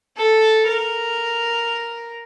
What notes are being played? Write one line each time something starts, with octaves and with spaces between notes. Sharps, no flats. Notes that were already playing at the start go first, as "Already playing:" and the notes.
A4
A#4